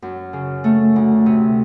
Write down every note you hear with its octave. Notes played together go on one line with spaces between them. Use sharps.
F#2
C#3
A3
D2
C3